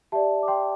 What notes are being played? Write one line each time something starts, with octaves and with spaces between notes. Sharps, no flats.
G4 D5 E5 A5
D6
G5 C6